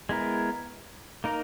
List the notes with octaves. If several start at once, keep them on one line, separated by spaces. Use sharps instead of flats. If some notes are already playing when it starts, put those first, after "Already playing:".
G#3 B3 E4 A#4
A#3 D#4 A#4